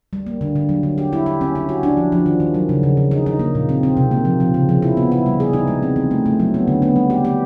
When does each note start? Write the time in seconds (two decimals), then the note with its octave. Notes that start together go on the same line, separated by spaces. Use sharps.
0.13 G3
0.27 A#3
0.41 D3
0.56 D3
0.69 F#3
0.83 D3
0.98 G4
1.13 E4
1.26 G4
1.41 C#4
1.55 C#4
1.69 F#4
1.83 D4
1.97 F3
2.12 F3
2.26 D#3
2.40 D#3
2.54 F#3
2.69 C#3
2.83 C#3
2.97 C#3
3.11 D#4
3.26 D#4
3.39 A#3
3.55 A#2
3.69 C4
3.83 C4
3.97 C3
4.11 A#3
4.25 F3
4.40 F3
4.54 C#3
4.69 F3
4.82 E4
4.97 B3
5.12 E4
5.26 G3
5.40 G#4
5.53 D#4
5.68 G#3
5.82 C4
5.96 E3
6.11 A3
6.26 A3
6.40 F#3
6.54 B3
6.68 D3
6.82 B3
6.96 G3
7.10 G4
7.25 G4